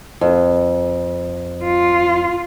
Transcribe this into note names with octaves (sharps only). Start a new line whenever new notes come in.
F2
F4